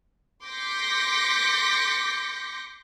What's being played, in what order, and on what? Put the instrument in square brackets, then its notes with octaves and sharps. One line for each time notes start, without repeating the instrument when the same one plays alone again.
[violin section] C6 D6 G6 A#6 B6 C#7